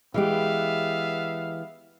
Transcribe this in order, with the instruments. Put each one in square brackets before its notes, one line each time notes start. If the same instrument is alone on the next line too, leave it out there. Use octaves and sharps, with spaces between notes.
[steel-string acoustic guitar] E3 G#3 G4 [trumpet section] B3 E5 F5